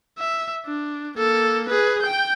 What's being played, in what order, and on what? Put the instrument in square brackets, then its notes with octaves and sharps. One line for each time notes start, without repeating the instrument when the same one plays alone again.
[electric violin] E5
D4
A#3 A4
G#4 B4
G5 G6